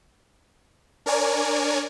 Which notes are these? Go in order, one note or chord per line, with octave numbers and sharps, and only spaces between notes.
D4 A#4 C#5 D5 G#5